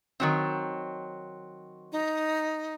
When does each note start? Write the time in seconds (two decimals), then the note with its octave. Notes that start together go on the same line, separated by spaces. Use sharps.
0.20 D#3 F#3 C4
1.92 D#4